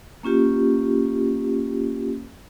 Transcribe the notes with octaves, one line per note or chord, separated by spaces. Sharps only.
A#3 C#4 F4 G4